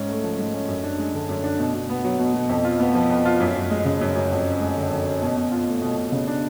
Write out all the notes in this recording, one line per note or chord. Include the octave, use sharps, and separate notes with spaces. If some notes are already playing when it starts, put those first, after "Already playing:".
Already playing: G#2 C#4
A3
F3
G#2
C#4
F#2
D4
G#3
D3
F#2
D4
B2
B2
B3
F#3
B2
B2
F2
F4
B3
F3
F2
F4
F#2
F#2
G#3
C#3
F#2
F#2
F2
C#4
G#3
D3
F2
C#4
B2
B2
F4
A3
B2
B2
C#3
D4